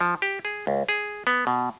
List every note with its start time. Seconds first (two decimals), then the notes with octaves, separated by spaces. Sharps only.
0.01 F3
0.22 G4
0.45 G#4
0.67 C#2
0.89 G#4
1.27 B3
1.47 B2